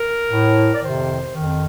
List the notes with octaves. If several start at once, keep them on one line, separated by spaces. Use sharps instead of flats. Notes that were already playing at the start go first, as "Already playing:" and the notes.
Already playing: A#4
A2
D5
F2 C3 D#3 C5
F2 D#3